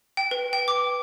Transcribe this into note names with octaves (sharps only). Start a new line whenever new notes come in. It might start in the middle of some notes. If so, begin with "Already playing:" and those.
G5
B4
G5
D6